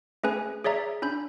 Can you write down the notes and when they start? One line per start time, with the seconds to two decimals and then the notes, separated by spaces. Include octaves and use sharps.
0.24 A3 C#4 G#4 B4 G#5
0.64 G#4 C#5 D5 E5 A#5
1.02 C#4 D4 B5 G6